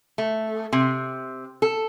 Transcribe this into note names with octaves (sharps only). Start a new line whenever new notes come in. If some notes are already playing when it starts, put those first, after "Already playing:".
A3
C3
A4